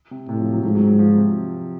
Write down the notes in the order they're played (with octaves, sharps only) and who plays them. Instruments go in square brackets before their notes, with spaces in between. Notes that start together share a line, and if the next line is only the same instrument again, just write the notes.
[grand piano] C3
[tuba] A2 [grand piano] C3
[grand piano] F3
F#3
[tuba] G#2 [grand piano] F3
[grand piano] F#3
F#3
F3
C3